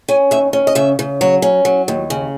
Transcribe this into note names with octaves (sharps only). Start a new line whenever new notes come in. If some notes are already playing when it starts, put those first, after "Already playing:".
C#4 G#5
D#2 E5
C#4
D#5
C#3 E5
C#3
F#3 C#5
C#4
F#3
D#2
C#3